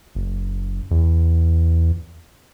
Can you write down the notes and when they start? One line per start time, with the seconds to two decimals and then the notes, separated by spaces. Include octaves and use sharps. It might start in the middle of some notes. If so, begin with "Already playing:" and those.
0.15 F#1
0.91 E2